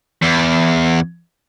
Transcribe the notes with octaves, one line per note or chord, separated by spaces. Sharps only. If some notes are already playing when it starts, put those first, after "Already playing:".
E2